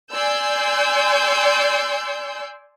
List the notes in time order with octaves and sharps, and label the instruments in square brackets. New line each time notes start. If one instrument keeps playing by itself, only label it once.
[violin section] D5 G#5 C6 E6 G6